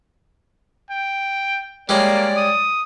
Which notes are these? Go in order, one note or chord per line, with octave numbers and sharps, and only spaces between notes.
G5
G3 G#3 A#3 C#4 D5
D#6